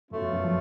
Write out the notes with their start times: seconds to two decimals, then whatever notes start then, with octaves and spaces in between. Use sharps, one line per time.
0.11 F#2 B2 A3 C#4 F4
0.22 F2
0.33 F#2
0.44 F3